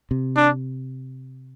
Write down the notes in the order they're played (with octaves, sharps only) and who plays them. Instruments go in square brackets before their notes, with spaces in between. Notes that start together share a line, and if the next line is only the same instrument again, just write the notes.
[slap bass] C3
[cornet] D4